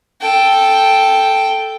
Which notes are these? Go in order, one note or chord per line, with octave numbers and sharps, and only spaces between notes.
A4 G5